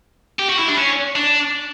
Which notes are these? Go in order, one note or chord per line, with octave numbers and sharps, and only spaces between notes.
G4
F#4
E4
D4
C#4
D4